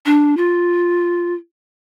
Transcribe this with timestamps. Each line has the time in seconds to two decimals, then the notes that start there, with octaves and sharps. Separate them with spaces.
0.06 D4
0.37 F4